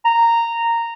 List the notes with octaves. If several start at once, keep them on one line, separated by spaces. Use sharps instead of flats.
A#5